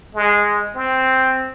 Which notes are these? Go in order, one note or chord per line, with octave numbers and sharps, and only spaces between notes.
G#3
C4